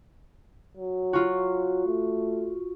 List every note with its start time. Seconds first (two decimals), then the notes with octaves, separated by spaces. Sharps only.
0.77 F#3
1.13 F4 F#4
1.87 A3